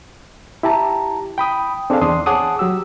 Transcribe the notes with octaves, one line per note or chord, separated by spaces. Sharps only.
E4 G4 A5 A#5
G5 B5 D#6
C4 D4 G#4 A4 C5 F5
E2 D4 C6 D#6
G#4 C#5 F#5 A5 D6 D#6
F#3 G4 E6